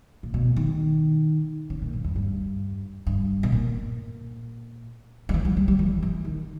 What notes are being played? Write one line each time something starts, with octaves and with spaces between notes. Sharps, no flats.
A#2
B2
D#3
C#3
A#2
G2
E2
G2
G2
B2
A#2
G3
E3
G3
G3
G3
E3
E3
D#3